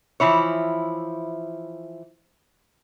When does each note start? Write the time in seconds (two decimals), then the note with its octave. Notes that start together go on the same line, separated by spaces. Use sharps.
0.20 E3 F3 E4 C#5